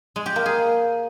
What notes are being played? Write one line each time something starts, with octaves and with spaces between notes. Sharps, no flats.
G#3
G4
A#3
G#4